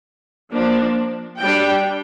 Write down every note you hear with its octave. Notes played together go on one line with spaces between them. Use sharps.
F3 A#3 D4
G3 D4 G5